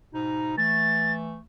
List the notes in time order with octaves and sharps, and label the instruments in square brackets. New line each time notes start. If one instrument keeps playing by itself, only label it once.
[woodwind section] G#2 B2 D#4
[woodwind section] E3 A3 [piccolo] A6